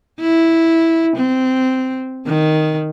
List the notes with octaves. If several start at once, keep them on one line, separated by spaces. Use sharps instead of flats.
E4
C4
D#3